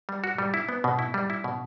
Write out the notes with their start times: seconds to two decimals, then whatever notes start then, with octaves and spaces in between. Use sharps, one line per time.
0.09 G3
0.24 F#4
0.38 G3
0.54 E4
0.69 B3
0.84 B2
0.99 E4
1.14 G3
1.30 E4
1.44 B2